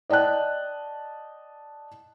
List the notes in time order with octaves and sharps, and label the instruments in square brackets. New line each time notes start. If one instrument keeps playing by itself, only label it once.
[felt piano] D5 D#5 G5 A5 F#6